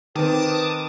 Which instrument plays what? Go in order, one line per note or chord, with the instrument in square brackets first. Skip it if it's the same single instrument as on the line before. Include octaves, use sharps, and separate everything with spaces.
[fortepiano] D#3 C4 [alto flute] B4 [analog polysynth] A5 D6 D#6